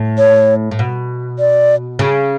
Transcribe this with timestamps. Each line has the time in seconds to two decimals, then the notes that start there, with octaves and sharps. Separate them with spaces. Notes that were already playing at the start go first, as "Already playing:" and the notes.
Already playing: A2
0.18 C#5
0.71 A2
0.79 B2
1.39 D5
1.99 C#3